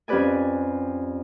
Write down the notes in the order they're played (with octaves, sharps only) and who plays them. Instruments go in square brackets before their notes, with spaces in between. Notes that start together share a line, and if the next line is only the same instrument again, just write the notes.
[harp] F2 C#4 G4 B4 D5 G#5